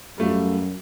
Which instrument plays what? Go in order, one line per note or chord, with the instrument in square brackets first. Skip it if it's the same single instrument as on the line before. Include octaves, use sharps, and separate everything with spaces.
[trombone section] F#2 [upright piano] G3 A3 F4